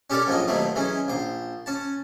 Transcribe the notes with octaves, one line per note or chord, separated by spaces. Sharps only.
C#4 G4 A4 A#4 C#5 D5
A#1 F3 F#3 G#3 D#5
D#2 B2 F#3 A3 C4
E3 F#3 G#3 C#4
A#1 C5
C#4 A5